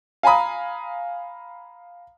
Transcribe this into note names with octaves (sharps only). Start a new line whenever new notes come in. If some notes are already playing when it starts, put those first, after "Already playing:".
F5 G#5 A#5 B5 D#6